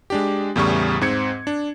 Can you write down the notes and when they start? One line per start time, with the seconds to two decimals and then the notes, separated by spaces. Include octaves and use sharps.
0.10 G#3 D4 G4
0.56 E2 A2 C#3 G3 C#6
1.01 G#2 C4 G#6 C#7
1.47 D4